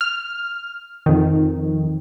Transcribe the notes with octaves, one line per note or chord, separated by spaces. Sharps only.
F6
F2 D#3